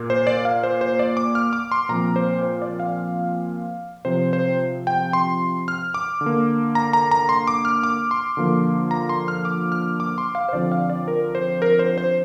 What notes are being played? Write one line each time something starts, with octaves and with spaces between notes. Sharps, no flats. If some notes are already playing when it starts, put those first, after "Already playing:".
Already playing: A#2 A#3
C5
D5
F5
C5
C5
D5
D6
F6
D6
C6
A#2 F3 C4 A#5
C5
C5
D5
F5
C3 F3 C4 C5
C5
G5
C6
F6
D6
D3
A#3
A#5
A#5
A#5
C6
D6
F6
D6
C6
D3 F3 A#3
A#5
C6
F6
D6
F6
D6
C6
F5
C5
D3 F3 C4 D5
F5
D5
A#4
C5
A#4
C5
C5